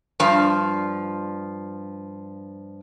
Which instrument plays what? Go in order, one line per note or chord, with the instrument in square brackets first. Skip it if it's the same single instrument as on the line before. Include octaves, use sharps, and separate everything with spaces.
[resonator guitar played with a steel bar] G2 F3